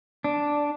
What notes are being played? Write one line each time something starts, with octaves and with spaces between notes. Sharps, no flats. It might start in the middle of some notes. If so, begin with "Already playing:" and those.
D4